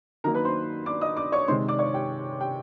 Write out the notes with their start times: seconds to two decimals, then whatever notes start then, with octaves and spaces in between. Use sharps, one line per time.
0.24 D#3 F#3 A#3 A#4 A#5
0.34 B4 B5
0.45 C5 C6
0.86 D5 D6
1.01 D#5 D#6
1.17 D5 D6
1.32 C#5 C#6
1.48 C3 D#3 G#3 C5 C6
1.68 D5 D6
1.79 C#5 C#6
1.94 G4 G5
2.41 G4 G5